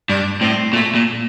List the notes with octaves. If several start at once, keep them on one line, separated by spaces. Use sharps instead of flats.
G2 D4
A2 C4
A#2 A3
A#2